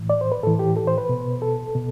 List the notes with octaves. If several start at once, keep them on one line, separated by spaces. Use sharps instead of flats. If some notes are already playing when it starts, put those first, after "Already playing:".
Already playing: A2 E3
D5
C5
B4
A2 E3 A4
G4
A4
C5
B4
B2
A4
B2